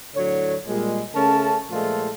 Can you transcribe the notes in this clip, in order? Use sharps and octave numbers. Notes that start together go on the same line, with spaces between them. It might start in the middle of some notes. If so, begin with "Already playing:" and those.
A2 D3 F#3 C#5
A#2 G3 G#3
C#3 A3 C#4 A#4 A5
A#2 F3 G#3 A3 F4 A4